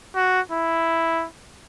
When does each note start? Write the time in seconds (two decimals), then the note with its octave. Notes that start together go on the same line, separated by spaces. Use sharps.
0.16 F#4
0.52 E4